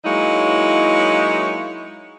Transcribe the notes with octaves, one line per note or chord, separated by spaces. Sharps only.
F#3 G#3 A#3 D#4 E4 C#5